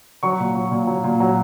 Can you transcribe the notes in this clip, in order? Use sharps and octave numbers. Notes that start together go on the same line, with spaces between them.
F#3 C#6
A#2
F#3
A#2
F#3
A#2
F#3